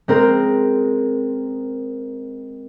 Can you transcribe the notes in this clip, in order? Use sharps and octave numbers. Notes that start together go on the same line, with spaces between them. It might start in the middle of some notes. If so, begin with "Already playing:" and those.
G#3 C4 A#4